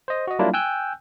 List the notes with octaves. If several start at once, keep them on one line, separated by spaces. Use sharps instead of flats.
C5 D#5
F#4 D#5
F#3 G3 A#3 D4 E4 F4
G5 G#5 E6 F#6 G6